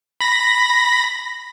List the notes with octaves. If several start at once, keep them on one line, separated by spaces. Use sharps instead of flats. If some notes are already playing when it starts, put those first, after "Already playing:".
B5 A#6